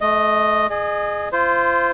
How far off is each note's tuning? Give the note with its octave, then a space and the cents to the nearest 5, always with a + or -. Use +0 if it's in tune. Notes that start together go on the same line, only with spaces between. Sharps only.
A3 -35 D#5 +0
G#4 +0 D#5 -35
F4 -30 C5 -10